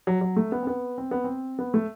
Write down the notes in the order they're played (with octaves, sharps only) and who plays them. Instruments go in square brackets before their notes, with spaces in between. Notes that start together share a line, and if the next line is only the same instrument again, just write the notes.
[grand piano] F#3
F#3
A3
B3
C4
B3
C4
B3
C4
B3
A3